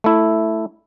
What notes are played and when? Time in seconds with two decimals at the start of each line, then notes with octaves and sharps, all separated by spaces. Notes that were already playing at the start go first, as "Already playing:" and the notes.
0.04 A3 E4